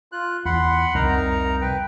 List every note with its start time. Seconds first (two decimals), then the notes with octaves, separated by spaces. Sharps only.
0.12 F4 F#6
0.45 E2 F#5 B5 C6
0.95 C2 F2 D#4 A#4 A#5
1.61 B4 G5